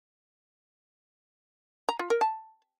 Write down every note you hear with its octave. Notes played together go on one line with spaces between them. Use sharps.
A#5
F4
A#4
A5